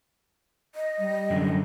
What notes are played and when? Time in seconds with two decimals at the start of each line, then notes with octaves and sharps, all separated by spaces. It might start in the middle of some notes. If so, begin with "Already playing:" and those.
0.75 D#5
0.98 G3
1.30 F#2 D3